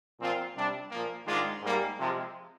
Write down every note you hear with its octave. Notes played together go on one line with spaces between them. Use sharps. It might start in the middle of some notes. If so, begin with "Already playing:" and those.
A#2 F3 C4 F4
C3 G3 D4
A#2 F3 A#3
G#2 D#3 G#3 D4 F4
G#2 G3 A#3
C3 F3 G#3